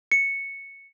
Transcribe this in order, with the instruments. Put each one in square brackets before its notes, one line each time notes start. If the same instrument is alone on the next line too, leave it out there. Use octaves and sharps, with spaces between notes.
[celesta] C#7